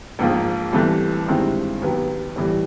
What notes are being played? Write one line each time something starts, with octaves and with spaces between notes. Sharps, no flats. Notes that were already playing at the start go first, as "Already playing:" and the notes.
A#1 G#2 F3 A#3
C2 C3 E3 A3
G2 D#3 G#3 C4 E4
D#2 D#3 F#3 B3
A2 E3 G3